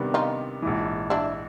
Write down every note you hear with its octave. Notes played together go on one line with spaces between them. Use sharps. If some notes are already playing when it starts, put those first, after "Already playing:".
Already playing: C3 D#3 G3 B3 D4
D#4 F4
A#1 G#2 E3
D4 E4